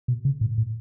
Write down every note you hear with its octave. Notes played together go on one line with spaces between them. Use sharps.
B2
C#3
A2
A2